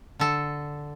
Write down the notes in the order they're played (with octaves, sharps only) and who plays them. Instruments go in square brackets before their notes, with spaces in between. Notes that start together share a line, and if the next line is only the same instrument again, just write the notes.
[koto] D3 A4